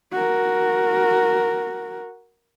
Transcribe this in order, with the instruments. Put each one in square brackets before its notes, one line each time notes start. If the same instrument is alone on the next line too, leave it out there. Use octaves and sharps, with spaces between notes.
[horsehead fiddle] F#4 A#4